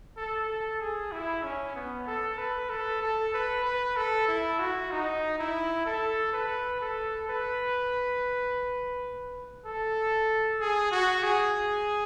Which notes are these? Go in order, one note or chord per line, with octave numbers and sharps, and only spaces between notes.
A4
A4
G#4
E4
C#4
B3
A4
B4
A4
A4
B4
B4
A4
E4
F#4
D#4
E4
A4
B4
A4
B4
A4
G#4
F#4
G#4